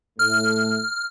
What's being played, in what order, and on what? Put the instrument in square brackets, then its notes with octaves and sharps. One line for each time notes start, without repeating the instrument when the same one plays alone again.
[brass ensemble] A2 A3 [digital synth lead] F6